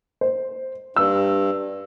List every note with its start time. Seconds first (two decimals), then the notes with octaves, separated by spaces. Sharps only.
0.21 C5
0.96 G2 E6